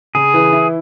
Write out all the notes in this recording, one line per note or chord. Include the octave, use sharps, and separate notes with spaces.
C#3 G#4
E3
E4